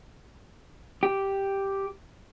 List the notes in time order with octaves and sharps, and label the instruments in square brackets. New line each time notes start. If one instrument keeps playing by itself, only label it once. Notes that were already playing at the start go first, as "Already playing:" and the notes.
[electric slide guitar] G4